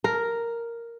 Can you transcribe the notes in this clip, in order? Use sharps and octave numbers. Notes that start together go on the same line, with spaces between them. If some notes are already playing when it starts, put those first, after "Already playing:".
A#4